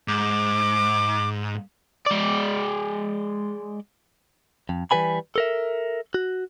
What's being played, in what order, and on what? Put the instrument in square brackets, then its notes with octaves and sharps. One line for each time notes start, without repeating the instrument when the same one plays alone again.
[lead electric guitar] G#2 [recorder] D6
[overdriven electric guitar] G#3 D5
[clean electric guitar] F2
E3 G3 B4 G#5 B5
A4 A#4 E5
F#4